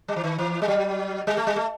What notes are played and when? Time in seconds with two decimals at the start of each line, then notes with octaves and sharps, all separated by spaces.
0.08 G3
0.16 E3
0.24 D#3
0.38 E3
0.62 G3
0.68 F#3
1.27 G3
1.37 A3
1.47 G3
1.56 A3